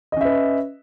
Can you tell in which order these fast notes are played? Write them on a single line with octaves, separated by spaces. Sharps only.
D#5 C#4 E5 B4